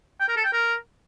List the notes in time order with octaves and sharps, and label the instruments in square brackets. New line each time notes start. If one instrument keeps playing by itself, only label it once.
[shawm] G5
A#4
A4
G5
A#4